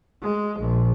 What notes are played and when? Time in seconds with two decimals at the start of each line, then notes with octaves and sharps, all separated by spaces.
0.22 G#3
0.60 A#1